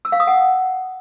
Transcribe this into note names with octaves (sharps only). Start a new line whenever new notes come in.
E6
F5
D#6
F#5